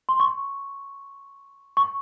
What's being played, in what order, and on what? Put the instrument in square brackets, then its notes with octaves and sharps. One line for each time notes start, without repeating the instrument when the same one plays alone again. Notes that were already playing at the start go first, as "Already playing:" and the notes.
[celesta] C6
C#6
C#6